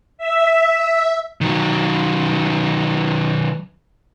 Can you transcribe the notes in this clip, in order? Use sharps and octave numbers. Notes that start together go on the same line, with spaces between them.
E5
D#3 F#3